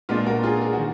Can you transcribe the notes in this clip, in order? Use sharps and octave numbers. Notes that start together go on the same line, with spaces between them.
A#2 G#3 B3 D4 F4
F#4 A#4
F4 G#4
G#4
F#4
D#3